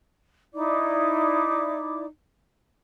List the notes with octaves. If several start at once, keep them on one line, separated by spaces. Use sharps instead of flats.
D#4 E4 D5 D6